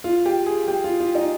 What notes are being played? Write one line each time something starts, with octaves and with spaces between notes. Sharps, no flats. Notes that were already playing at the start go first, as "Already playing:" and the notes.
F4
G4
G#4
G4
F4
F4
D#4